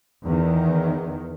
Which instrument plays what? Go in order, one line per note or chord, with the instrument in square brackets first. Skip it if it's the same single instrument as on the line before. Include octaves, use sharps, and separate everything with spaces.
[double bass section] E2 D#3